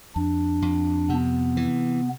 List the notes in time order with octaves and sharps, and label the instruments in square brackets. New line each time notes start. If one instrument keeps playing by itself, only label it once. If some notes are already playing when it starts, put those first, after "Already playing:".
[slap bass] F2 [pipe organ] D4
[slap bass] F2
[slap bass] C3 [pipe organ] B3
[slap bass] E3